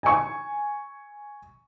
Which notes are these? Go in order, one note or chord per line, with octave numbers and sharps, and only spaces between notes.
G#5 C#6